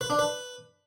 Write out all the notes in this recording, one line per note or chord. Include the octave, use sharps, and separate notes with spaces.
B4
D4
B4